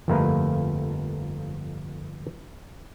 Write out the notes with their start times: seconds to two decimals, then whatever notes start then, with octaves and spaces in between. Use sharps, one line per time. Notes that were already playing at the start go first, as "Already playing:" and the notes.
0.08 G1 F2 A3 A#3 A#4 B4